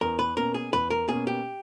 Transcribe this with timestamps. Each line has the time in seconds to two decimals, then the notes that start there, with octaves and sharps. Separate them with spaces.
0.01 E2 A#4
0.19 B4
0.37 B2 A#3 C#4 A#4
0.54 G#4
0.73 E2 B4
0.90 A#4
1.09 B2 A#3 C#4 G#4
1.27 G4